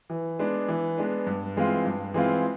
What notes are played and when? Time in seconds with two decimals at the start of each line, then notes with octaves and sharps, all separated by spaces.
0.10 E3
0.39 G#3 B3 D4
0.68 E3
0.98 G#3 B3 D4
1.27 G2
1.56 E3 G#3 C4 F4
1.85 G2
2.14 E3 G#3 C4 F4